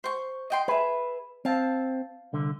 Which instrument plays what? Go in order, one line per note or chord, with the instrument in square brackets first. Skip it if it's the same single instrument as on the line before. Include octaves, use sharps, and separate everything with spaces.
[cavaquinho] C5 C#6
D#5 G5 C6
[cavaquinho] G#4 E5 [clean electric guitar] B4
[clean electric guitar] C4 [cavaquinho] F5 A5
[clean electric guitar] C2 D3